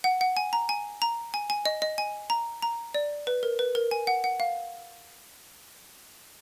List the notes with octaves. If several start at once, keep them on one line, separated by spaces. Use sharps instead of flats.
F#5
F#5
G#5
A#5
G#5
A#5
G#5
G#5
D#5
D#5
G#5
A#5
A#5
D5
B4
A#4
B4
A#4
G#5
F#5
F#5
F5